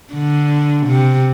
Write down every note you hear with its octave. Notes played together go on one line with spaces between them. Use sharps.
D3
C3